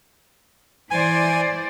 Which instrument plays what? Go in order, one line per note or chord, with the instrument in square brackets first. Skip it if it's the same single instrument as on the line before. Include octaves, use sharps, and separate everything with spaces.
[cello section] E3 C5 D5 [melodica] G#5